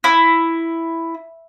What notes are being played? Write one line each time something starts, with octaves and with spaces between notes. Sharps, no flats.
E4